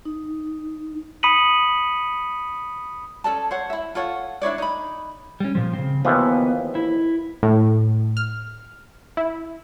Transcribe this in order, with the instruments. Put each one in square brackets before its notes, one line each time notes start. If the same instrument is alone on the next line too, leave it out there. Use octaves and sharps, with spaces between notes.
[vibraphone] D#4
[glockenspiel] B5 D#6 B6 C#7 D#7 F#7
[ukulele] C#4 A4 D5 A5
C5 C#5 F#5
E4 E5
F4 A4 C#5 F#5
D4 E4 C#5 D5
D#4 B5
[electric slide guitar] G3 C#4
A#2 F3
C#3 C4
[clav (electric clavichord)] D#2 E3 F3 [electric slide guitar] B3
[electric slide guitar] E4
[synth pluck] A2
F6
E4